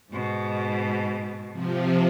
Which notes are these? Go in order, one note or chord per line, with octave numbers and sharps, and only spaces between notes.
G#2 B2
C3 F3